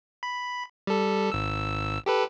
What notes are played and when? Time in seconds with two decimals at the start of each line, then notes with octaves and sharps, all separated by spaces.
0.23 B5
0.87 G3 A4
1.32 G#1 E6
2.06 G4 A4 B4